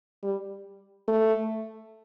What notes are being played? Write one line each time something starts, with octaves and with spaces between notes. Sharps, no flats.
G3
A3